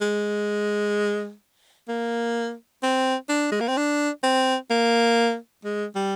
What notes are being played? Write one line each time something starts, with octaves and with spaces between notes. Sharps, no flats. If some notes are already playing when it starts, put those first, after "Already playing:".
G#3
A#3
C4
D4
G#3
A#3
C4
D4
C4
A#3
G#3
G3